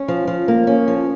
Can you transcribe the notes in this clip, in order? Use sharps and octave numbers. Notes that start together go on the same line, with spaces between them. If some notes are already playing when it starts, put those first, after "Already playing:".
Already playing: C#4
F3
F3
A#3
C#4
F3